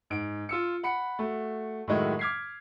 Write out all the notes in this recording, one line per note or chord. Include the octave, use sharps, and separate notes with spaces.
G#2 D7
F4 E6 C#7
F#5 B5 C#7
A3 F#4
A2 D#3 F#3 G#3 A3
D6 F6 G#6 B6 C7